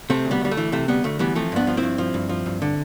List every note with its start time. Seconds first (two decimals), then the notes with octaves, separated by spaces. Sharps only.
0.10 C3 A3 C4
0.25 D2
0.31 G3 B3
0.41 D2 G3
0.51 A3
0.57 E3
0.72 C3 A3
0.88 D2 G3 B3
1.04 D2 A3
1.19 E3 G3 B3
1.35 F3 A3 C4
1.52 G2 B3 D4
1.67 F3
1.77 C4 E4
1.83 G2
1.98 F3
2.14 G2
2.29 F3
2.46 G2
2.62 D3